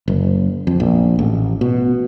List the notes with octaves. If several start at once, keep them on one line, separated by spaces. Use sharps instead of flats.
F#1
F2
A#1
A1
B2